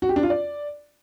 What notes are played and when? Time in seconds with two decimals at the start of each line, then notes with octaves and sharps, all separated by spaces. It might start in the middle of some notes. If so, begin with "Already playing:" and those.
0.02 F#4
0.09 G4
0.16 D4
0.23 F4
0.30 D5